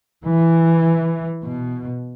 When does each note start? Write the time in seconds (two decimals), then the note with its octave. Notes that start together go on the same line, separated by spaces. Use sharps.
0.25 E3
1.44 B2